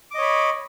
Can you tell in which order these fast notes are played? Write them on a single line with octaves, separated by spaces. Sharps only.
D6 D#5 C#5 B5